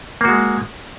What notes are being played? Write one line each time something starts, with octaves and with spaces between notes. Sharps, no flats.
G#3 A#3 F#4